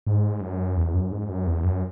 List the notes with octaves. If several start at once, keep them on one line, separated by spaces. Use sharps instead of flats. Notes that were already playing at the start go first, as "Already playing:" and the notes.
G#2
F#2
E2
F#2
G#2
F#2
E2
F#2